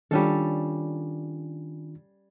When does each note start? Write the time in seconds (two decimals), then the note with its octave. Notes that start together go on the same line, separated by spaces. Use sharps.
0.11 D#3 G3 C#4 D4 F4 A4